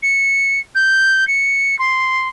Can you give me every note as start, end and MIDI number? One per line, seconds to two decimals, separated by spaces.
0.03 0.59 97
0.75 1.27 91
1.27 1.78 97
1.79 2.28 84